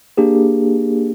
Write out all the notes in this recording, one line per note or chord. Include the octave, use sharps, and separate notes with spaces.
A#3 D4 G4 G#4